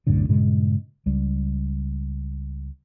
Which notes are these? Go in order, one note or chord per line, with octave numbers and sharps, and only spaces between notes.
C2 F#2 A2 D3
G2 A#2 C#3 G#3
C#2 G3